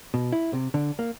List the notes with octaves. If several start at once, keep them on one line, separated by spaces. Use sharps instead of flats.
B2
E4
C3
D3
A#3